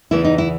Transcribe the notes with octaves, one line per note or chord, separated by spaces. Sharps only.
E2 C#3 E3 B3 E4
D#4
E4